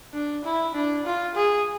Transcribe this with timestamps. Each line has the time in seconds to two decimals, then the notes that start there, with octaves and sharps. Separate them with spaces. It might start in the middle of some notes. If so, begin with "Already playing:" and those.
0.14 D4
0.44 E4
0.74 D4
1.05 F4
1.35 G#4